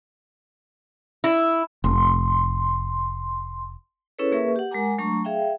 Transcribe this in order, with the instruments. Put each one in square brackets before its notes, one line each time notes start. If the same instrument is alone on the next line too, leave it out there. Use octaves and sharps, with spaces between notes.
[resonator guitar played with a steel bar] E4
[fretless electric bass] F1 [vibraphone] C6
[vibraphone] C#4 E4 G#4 A4 B4 C#5
A#3 G#4 A#4 B4 E5 C#6
G4 F#5
G#3 A#4 F#5 G#5 A#5 D6
F#3 A3 D4 A#5 C#6
G#4 E5 F5 G5